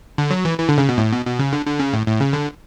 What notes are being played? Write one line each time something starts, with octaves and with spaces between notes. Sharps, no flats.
D3
F#3
E3
E3
D3
C#3
B2
A2
B2
B2
C#3
D3
D3
C#3
A2
A2
C#3
D3